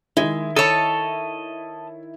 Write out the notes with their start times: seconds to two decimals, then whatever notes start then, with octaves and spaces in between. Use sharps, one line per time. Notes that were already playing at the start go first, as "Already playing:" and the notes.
0.17 D#3 G#3 E4
0.56 A4 C#5 D#5 A5